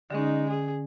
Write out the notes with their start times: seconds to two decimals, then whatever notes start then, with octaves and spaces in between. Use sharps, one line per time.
0.11 D3 G#3 C#4 D#4
0.48 G#4